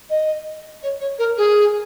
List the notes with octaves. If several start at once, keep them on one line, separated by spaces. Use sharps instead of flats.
D#5
C#5
C#5
A#4
G#4